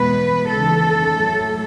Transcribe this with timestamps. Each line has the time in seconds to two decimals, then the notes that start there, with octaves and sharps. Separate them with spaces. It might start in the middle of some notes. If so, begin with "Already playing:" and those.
Already playing: E2 B2 G#3 B3 B4
0.50 D#2 C#3 E3 A4
1.13 A2 F#3 A3